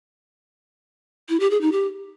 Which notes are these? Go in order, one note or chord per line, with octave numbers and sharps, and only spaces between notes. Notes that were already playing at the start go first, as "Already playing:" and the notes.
E4
G4
G#4
D#4
G4